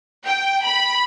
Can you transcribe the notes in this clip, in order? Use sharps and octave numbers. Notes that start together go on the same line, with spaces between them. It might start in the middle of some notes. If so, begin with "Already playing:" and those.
G5
B5